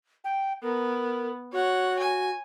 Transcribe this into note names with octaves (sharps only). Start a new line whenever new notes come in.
G5
B3 A#4
F#4 C#5 F#5
G#5